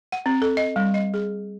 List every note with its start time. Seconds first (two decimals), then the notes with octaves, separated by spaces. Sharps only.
0.12 F#5
0.26 C4
0.42 A4
0.57 D#5
0.76 G3
0.94 D#5
1.14 G#4